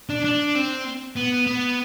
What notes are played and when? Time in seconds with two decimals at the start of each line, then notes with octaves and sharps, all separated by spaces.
0.09 D4
0.24 D4
0.55 C4
1.16 B3
1.47 B3